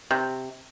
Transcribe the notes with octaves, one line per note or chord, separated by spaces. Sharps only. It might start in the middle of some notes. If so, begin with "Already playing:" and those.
C3